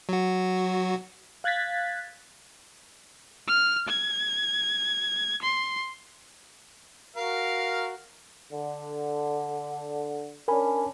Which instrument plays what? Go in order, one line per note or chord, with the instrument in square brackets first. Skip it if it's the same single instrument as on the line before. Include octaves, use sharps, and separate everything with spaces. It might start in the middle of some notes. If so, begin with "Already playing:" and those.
[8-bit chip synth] F#3 F#4
[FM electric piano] F5 F#6 G#6 A6 B6
[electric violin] F6
G#6
C6
[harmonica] F#4 A#4 F5
[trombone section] D3
[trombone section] C#4 D4 [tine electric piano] A#4 G#5 B5